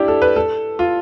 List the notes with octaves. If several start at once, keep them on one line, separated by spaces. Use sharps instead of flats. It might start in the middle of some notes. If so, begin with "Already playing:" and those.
Already playing: D4 E4 G4
A4
B4
A4
F4